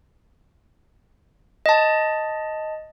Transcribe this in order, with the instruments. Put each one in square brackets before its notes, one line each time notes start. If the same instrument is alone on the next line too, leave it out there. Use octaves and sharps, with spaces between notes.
[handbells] D#5 A5